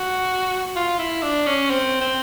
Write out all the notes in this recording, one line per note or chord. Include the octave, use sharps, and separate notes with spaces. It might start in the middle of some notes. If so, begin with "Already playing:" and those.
Already playing: F#4
F4
E4
D4
C#4
C4
C4